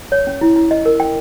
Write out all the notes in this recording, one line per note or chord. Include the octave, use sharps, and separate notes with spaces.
C#5
C#4
E4
E4
D#5
A#4
G5